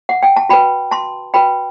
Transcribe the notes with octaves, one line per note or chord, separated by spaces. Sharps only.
F#5
G5
A5
F#4 B4 G5 B5
A5 C6
F#4 B4 G5 B5